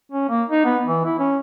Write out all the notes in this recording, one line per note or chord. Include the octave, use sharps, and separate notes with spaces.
C#4
A#3
D#4
B3
E3
E4
C#4